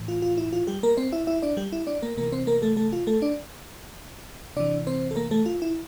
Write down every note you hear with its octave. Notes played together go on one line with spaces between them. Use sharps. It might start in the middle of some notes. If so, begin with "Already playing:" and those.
Already playing: A2 E3
F4
F4
E4
F4
G3 G4
A#3 A#4
C4 C5
E4 E5
E4 E5
D4 D5
G3 G4
E4
D4 D5
A#3 A#4
C3 E3 A#3 A#4
C4 C5
A#3 A#4
A3 A4
A3 A4
F4
A3 A4
D4 D5
C3 E3 D4 D5
C4 C5
A4
A#3 A#4
A3 A4
F4
E4